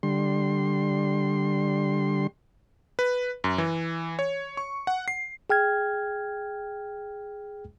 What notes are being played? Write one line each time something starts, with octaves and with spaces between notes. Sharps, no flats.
D3 G3 C6
B4
F#2
E3
C#5
C#6
F#5
C7
G#4 G5 F6 G#6